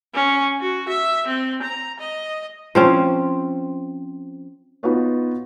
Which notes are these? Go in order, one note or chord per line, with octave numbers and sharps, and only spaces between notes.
C#4
F#4
E5
C4
A#5
D#5
F3 C4 C#4
B3 D#4 F4 F#4 B4 C#5